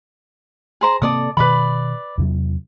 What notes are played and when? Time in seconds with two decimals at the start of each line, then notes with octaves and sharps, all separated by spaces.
0.81 G#4 C5 A#5
1.02 C3 A#3 C4 A4 D5 D#6
1.37 B2 D#3 B4 D5 B5
2.18 E2 C3 F#3